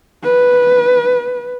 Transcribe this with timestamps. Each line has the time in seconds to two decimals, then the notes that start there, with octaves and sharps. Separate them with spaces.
0.23 B4